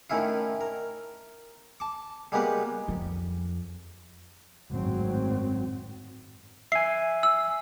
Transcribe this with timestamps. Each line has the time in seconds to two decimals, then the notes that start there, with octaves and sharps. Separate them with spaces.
0.10 A2 D#3 C#4 E4 F4
0.61 A#4
1.80 A5 D6
2.32 G3 G#3 A#3 B3 G4 B4
2.88 F2
4.72 G#1 F#2 A2 F#3 C4
6.72 E5 G#5 C7
7.23 E6